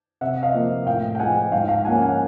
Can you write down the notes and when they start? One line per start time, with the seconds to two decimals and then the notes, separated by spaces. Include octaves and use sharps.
0.21 C3 E5 F#5
0.43 D#5 F5
0.54 F3 A#3
0.86 A2 F5 G5
1.15 G5
1.19 F3 G#3 F#5 G#5
1.52 G#2 F5 G5
1.69 F5 G5
1.85 F3 A#3 C#4 F#5 G#5
2.02 F#5 G#5